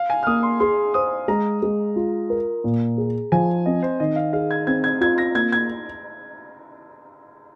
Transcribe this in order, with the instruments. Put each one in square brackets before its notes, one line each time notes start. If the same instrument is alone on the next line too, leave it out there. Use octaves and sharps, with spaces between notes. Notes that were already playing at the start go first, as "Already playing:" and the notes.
Already playing: [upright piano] F5
G#5
F6
[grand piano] A#3 [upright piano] D#6
[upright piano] C6
[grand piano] G#4 [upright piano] C6
[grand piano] C5 [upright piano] D#6
[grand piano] G#3 [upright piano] A#5
[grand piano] G#3
F4
A#4
A#2
G#4
[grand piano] F3 [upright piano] G#5
[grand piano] C4 [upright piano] D#5
[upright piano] C5
[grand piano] D#3 [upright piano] D#5
[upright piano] F5
[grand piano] G#4 [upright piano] F5
[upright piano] G#6
[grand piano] C4 [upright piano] G#6
[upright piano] G#6
[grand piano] F4 [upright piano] G#6
[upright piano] A#6
[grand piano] A#3 [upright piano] G#6
[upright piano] G#6